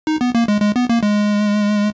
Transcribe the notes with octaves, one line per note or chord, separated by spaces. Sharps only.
D#4
B3
A#3
G#3
G#3
B3
A#3
G#3